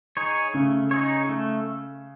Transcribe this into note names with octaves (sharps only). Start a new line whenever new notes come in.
D#4 G#4 C#5
C#3 A3
D#4 G#4 C#5
A3